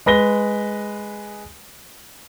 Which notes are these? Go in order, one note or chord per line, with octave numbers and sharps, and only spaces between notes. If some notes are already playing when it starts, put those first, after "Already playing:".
G#3 B4 A#6 G7